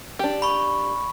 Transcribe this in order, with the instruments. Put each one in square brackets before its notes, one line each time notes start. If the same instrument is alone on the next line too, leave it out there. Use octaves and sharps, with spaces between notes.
[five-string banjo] D4 G4
[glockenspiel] B5 C#6